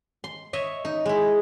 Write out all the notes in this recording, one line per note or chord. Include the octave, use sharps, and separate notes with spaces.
C6
C#5 D#5 E5
D#4
G#3 E4